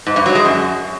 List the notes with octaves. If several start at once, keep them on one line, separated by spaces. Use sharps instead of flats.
G#2
G2
F#3
G#3
F#2